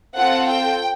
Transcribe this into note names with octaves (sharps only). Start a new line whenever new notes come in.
C4 F4 A4 F#5
G5